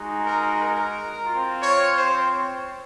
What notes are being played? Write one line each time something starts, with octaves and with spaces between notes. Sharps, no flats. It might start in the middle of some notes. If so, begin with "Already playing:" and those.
Already playing: G#3 D#4 F#4
A#4
A#4
C4 F4
C#5
C5
C#5